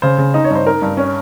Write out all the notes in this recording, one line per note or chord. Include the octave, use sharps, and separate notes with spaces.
C#3 C5
C#3
D#4 D#5
C#5
G2 C5
D#4 A#4
G2
C#4